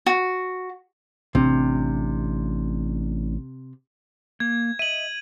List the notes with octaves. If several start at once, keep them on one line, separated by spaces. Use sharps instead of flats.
F#4
A1 C3 D4
A#3 G#6
D#5 E5 D#7 F#7